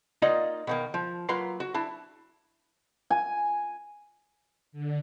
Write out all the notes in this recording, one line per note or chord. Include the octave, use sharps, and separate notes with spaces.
A#3 D#4 F4 D5 D#5 F#5
B2 D#3 A#3
F3
F#3 A#3 F4 B4 A#5 C6
F#4
D4 E4
G#5
D3